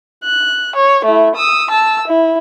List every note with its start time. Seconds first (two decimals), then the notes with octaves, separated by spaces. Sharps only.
0.24 F#6
0.76 C#5
1.05 A3 E4
1.35 D#6 E6
1.70 A5 E6
2.07 E4